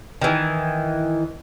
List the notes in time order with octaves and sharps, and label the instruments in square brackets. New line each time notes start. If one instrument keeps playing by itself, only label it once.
[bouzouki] D#3 E3